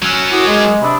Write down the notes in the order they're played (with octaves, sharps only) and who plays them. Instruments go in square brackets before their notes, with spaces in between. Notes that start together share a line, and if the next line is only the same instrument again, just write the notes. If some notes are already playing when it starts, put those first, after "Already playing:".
[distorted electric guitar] F#3 C#4 [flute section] B5 E6 F#6
[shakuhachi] E4 [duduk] F#4 [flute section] A#4 D6 D#6
[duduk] G#3 [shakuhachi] G#4
[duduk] C3 [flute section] D4 D#6 E6 [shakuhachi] B5